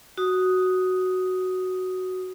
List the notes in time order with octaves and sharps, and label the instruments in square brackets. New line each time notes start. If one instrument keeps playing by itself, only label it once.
[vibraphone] F#4 D#6